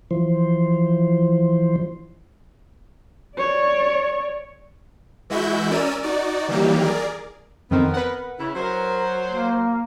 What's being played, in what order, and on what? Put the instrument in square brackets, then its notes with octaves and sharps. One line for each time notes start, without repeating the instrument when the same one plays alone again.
[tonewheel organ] E3 F3 C5
[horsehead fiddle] C#5 D5
[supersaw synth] E3 G#3 E4 F#4 E5 G6
C#4 A#4 D5 E6 D#7
D#4 F#4 D5
D#3 E3 F#3 G3 A#3 G4
G#4 A#4 D5
[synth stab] F2 D#3 C4 [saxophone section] B3 A#4
[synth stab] B4 F#5
[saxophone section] C#3 E4
[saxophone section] F#3 C5 [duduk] A#4
[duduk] A#3